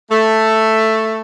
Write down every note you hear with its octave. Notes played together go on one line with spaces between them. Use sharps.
A3